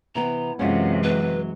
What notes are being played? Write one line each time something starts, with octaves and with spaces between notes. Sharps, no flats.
C3 E3 B3 A#5
F#2 C3 E3 G#3 C#4 F4 F#5
F#3 B4